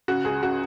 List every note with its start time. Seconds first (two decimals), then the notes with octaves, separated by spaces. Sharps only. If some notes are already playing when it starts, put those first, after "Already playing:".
0.08 C#3 F#4
0.24 C#2 G#4
0.42 C#3 F#4